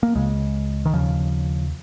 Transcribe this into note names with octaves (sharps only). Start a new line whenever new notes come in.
A#3
C#2 C#3 G#3
D#3
D#2 C#3 F3